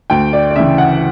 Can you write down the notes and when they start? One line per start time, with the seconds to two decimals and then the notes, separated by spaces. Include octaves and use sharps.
0.10 D2 G5
0.33 D5
0.51 D5
0.56 C#3 E3 E5
0.78 F#5